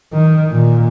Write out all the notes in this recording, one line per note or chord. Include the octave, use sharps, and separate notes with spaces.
D#3
A#2